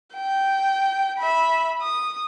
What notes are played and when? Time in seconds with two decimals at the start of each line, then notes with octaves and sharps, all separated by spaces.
0.15 G5
1.19 E5 B5
1.81 D#6